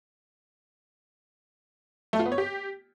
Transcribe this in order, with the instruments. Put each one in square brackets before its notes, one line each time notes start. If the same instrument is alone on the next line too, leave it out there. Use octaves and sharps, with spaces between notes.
[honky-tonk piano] A3
F4
B3
C#5
G4